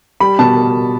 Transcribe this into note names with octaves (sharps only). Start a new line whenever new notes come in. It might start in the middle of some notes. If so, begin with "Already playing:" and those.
G3 B5
B2 A5